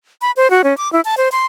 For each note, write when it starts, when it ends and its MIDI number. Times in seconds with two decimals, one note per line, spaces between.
0.21 0.31 83
0.37 0.50 72
0.50 0.62 66
0.64 0.76 61
0.78 0.91 86
0.93 1.01 64
1.05 1.15 81
1.17 1.29 72
1.32 1.46 84